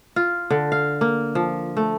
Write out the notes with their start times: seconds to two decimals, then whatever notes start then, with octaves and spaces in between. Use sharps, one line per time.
0.16 F4
0.50 D3
0.72 F5
1.01 A#3
1.35 F3
1.77 A3